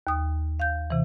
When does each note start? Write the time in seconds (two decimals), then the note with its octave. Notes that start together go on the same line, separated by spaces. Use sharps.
0.07 D#2 D#6
0.60 F5 G6
0.90 C3 E3